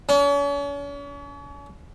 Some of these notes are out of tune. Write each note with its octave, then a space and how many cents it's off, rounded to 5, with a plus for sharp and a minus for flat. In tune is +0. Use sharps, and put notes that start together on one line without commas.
C#4 +40